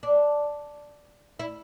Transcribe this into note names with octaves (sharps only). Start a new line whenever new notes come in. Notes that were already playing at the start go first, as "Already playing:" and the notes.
D4
E4